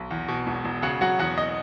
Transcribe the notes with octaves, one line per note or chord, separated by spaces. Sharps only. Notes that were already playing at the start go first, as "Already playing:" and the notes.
Already playing: B1
E2
B2
E1
E1
C#3 F#4 F#5
F#3 F#4 F#5
E2 F#4 F#5
D#5